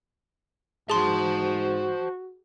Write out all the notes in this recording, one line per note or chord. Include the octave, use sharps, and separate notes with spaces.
G#2 F#4 G#4 C5 A5 C6